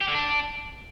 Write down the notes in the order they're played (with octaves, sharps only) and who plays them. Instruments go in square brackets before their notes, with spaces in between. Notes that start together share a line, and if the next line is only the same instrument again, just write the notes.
[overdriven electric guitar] G4
D3
D4